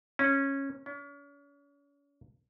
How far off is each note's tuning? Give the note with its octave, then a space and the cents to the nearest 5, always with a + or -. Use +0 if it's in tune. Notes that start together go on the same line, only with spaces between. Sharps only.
C#4 -15
C#4 +40